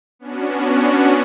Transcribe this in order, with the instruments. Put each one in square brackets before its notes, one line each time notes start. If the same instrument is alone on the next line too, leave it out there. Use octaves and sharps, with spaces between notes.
[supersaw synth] B3 C#4 D4 F#4